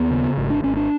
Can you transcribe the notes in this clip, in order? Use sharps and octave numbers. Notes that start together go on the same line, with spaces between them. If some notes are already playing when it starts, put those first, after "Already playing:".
Already playing: D#2 B3
C#3
G#1
D4
G#1 C#4
D4